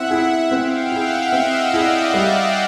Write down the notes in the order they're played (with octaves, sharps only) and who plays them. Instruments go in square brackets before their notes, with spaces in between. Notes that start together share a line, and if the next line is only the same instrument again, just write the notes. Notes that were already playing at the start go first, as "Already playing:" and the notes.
Already playing: [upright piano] C4 E4 [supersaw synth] E5 F#5
[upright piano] E4 G#4
[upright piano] C4 [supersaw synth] F5 G5
[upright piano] E4 G#4 [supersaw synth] E5 F#5
[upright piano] C4 [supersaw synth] D#5 F5
[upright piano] E4 G#4 [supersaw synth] D5 E5
[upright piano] G3